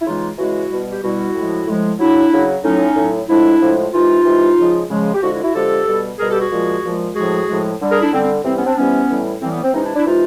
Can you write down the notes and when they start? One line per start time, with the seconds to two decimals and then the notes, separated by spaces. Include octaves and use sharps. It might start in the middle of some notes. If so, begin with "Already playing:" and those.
0.01 E4
0.05 C#3 E3 G#3 D#4 F4
0.38 C#3 E3 G#3 E4 F#4
0.70 B2 G3
0.91 G4
1.02 B2 G3 E4 F#4
1.34 A2 F3 G#3
1.67 A2 F3 G#3
1.99 C#3 F#3 D4 E4
2.31 C#3 F#3
2.64 A2 F#3 C#4 D#4
2.96 A2 F#3
3.29 A2 F3 G#3 D4 E4
3.61 A2 F3 G#3
3.92 C3 E3 G#3 D#4 F4
4.25 C3 E3 G#3
4.58 C#3 F3 G#3
4.89 C#3 F3 G#3
5.13 G4
5.22 D3 F3 G#3 E4 F#4
5.32 E4 F#4
5.43 E4 F#4
5.54 D3 F3 G#3 G4 A4
5.87 B2 G3
6.18 B2 G3 G#4 A#4
6.30 G4 A4
6.40 F#4 G#4
6.51 A#2 F3 G#3
6.84 A#2 F3 G#3
7.15 A2 F3 G#3 F#4 G#4
7.47 A2 F3 G#3
7.81 D3 G3
7.90 G#4 A#4
8.01 D4 E4
8.12 D3 C4
8.16 G3
8.23 C4
8.44 C3 E3 G3 C4
8.55 B3 C#4
8.66 C4 D4
8.76 C3 E3 G3 B3 C#4
9.09 A2 E3 G3
9.41 A2 E3 G3 C4
9.52 B3
9.63 C4
9.73 C3 E3 G#3 C#4 D#4
9.84 D4 E4
9.95 D4 E4
10.06 C3 E3 G#3 D#4 F4